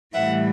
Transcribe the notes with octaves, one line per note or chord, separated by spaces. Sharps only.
A2 E3 G3 E5 F#5